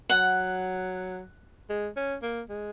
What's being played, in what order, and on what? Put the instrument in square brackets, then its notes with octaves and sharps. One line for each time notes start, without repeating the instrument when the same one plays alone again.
[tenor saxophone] F#3 [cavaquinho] F#5
[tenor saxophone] G#3
C#4
A#3
G#3